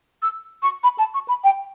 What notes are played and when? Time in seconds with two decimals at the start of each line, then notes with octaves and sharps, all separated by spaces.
0.22 E6
0.63 C#6
0.84 B5
0.99 A5
1.14 C#6
1.28 B5
1.44 G5